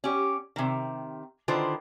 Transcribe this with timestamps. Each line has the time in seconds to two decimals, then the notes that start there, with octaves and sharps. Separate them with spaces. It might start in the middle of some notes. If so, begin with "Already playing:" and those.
0.04 C#4 G4
0.56 C3 D#3
1.48 D3 D#3 E4 F4 B4 C5